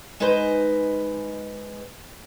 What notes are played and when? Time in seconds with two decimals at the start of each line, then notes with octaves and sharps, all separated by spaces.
0.20 G#3 D#4 G#4 B4 C5